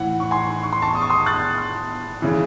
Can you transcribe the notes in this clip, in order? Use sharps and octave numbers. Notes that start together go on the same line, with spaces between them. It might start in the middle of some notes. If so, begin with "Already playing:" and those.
Already playing: A2 E3 F#5
C#6
G#5 C6
C#6
C6
A5 C#6
D#6
C#6
C6 D#6
F#6 A6
C#3 E3